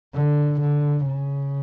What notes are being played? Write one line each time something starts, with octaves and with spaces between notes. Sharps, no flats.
D3
D3
C#3